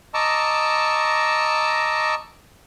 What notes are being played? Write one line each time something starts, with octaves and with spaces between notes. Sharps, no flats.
D#5 A5 A#5 C#6 D6 E6